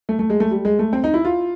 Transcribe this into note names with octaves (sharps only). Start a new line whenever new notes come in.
A3
A3
G#3
A3
G3
G#3
A3
C4
D#4
E4
F4